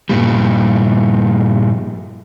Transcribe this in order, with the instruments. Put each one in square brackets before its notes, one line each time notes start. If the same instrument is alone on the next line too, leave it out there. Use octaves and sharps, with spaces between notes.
[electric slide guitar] G2 A#2 G3